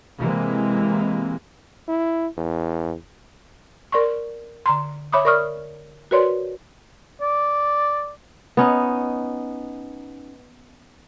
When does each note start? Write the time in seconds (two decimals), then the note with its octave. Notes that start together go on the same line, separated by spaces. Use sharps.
0.19 C3 E3 G#3 A#3 C4
1.88 E4
2.37 E2
3.92 A#4 D5 C6 C#6
4.66 D3 A#5 C6
5.12 C#5 E5 B5 D6 D#6
5.25 A#4 D5 C#6 D#6 F6
6.11 F#4 A#4 B4 C#5 D5 C6
7.21 D5
8.57 B3 C#4 D#4